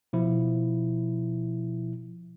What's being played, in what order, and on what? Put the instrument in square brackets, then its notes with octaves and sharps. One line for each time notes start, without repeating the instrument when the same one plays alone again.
[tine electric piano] B2 F3 E4